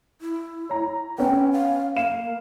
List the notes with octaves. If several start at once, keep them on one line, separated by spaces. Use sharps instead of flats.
E4
C#5 A#5
B3 C#4 G5
F5
A#3 F5 E7